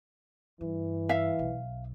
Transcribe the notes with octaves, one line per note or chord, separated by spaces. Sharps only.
G2 E3
E5 F5
B1